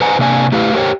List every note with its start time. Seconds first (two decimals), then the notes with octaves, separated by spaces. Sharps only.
0.01 B4 C5 D#5 F#5 G#5 A#5
0.19 C3 A#3 D4 F5 G#5
0.52 A3 E4 G4 B4 F5
0.74 G4 A#4 C5 C#5 G5